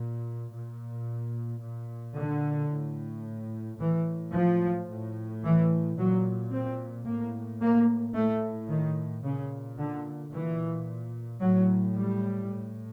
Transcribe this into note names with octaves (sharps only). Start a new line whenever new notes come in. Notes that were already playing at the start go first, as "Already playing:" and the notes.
Already playing: A#2
A#2
A#2
D3
A2
A2 E3
F3
A2
E3
A#2 F#3
C4
A2 A#3
A#3
A2 A3
D#3
A#2 C#3
D3
A#2 E3
A2 F#3
G3
A2